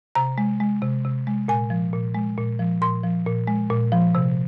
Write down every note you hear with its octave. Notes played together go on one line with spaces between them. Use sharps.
C3 A#5
G#3
G#3
C3
C3
G#3
A#2 G#5
F3
A#2
G#3
A#2
F3
A#2 C6
F3
A#2
G#3
A#2
F3
C3